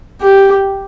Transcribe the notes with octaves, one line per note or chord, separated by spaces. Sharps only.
G4